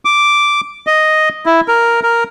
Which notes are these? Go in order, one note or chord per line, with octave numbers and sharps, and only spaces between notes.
D6
D#5
E4
A#4
A#4